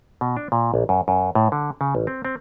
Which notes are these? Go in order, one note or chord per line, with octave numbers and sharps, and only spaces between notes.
B2
D4
A#2
A#1
F#2
F#2
A2
D3
C#3
A1
C4
C4